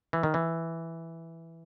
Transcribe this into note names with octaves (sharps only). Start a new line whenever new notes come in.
E3
D#3
E3